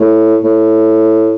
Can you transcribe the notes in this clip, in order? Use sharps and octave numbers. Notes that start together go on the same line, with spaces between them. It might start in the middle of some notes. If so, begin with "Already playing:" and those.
Already playing: A2
A2